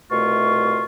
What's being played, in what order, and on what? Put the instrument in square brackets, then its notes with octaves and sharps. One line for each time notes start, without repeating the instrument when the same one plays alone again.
[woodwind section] C2 B2 A3 F4 C#6